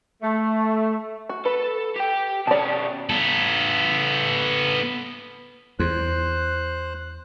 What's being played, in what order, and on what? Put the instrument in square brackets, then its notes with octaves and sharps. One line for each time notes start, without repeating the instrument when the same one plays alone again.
[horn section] A3
[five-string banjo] F#4
[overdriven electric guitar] A4 [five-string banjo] B4
[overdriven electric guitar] G4 G5
[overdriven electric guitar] B2 C#4 [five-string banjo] D5 A5
[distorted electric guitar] B3 A4
[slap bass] E2 [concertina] C5 F#6